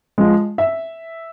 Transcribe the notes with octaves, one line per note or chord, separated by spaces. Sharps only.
F3 G#3
E5